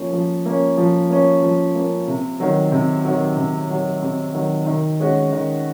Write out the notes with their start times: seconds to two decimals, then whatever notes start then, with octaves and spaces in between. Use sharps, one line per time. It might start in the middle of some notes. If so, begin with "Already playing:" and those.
Already playing: F3 A#3 C#4
0.12 F3
0.46 A#3 C#4
0.78 F3
1.10 A#3 C#4
1.43 F3
1.75 A#3 C#4
2.08 C3
2.40 D#3 F#3
2.72 C3
3.05 D#3 F#3
3.36 C3
3.70 D#3 F#3
4.02 C3
4.34 D#3 F#3
4.66 D#3
5.00 G#3 C#4 F#4
5.32 D#3